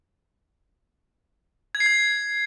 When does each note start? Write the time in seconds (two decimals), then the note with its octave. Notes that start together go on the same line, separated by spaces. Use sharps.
1.75 G#6
1.80 C7
1.86 G#6